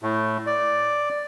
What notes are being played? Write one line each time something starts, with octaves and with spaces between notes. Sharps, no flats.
A2
D5